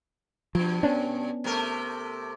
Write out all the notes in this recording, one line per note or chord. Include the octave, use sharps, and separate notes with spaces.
G2 B2 F3
B3 C#4 D4
C3 A3 A#4